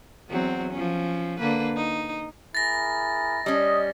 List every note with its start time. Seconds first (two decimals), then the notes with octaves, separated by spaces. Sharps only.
0.29 E2 F#3 C4
0.73 F3 C#4
1.39 D3 A#3 B4
1.76 D#4
2.55 E4 G#4 A#4 A6 A#6
3.46 G3 C#4 D#5